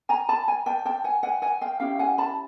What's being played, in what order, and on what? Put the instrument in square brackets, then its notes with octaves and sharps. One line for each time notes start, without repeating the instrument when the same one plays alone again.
[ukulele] G#5 A#5
A5 B5
G#5 A#5
G5 A5
G5 A5
F#5 G#5
F#5 G#5
F#5 G#5
F5 G5
C#4 E4 G4 F5 G5
F#5 G#5
A5 B5